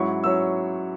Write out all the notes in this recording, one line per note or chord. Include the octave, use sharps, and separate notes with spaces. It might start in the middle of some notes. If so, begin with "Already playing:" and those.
Already playing: G#2 F#3 C#4 E4 C#6
F#3 C#4 E4 E6